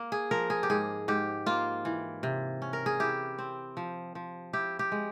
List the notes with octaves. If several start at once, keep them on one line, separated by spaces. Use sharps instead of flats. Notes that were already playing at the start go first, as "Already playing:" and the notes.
Already playing: A#3
G#4
F3 A#4
G#4
G4
G#2 G#4
G#2 G4
A#3 F4
E3
C3
C#4
A#4
G#4
E4 G4
C4
F3
F3
E4 G4
G4
G#3